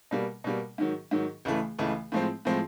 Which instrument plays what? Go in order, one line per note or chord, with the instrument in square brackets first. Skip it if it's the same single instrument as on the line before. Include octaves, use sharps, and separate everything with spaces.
[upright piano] B2 G3 A#3
B2 G3 A#3
G#2 D#3 F#3
G#2 D#3 F#3
C#2 C#3 E3 A3
C#2 C#3 E3 A3
A2 F3 G#3 C4
A2 F3 G#3 C4